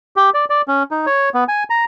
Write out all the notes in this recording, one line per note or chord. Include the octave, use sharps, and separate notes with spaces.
G4
D5
D5
C#4
D#4
C#5
B3
G#5
A#5